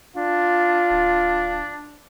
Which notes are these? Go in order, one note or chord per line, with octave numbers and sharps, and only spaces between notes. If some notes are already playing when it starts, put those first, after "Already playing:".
D4 F4
D1